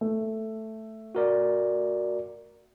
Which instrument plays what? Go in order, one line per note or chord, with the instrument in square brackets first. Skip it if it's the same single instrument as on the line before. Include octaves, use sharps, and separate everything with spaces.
[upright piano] A3
[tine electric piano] F#4 A#4 D5